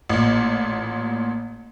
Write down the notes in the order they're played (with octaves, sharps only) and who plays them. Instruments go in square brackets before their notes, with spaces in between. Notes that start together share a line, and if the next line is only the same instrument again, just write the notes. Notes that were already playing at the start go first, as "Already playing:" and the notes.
[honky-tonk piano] A1 A#2